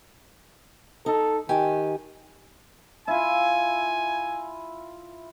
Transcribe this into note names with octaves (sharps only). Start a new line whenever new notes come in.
D#4 A4
D#3 G4 G#5
E4 F4 G#5